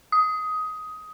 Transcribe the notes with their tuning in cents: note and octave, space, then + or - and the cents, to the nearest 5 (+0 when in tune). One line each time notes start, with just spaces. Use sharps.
D#6 +15